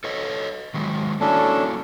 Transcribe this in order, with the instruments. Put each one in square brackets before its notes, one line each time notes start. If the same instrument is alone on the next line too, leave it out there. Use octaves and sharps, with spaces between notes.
[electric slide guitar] A4 C#5 D#5
D#3 F#3 G#3
[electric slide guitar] A#3 E4 F#4 [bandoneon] C#4 D4 A4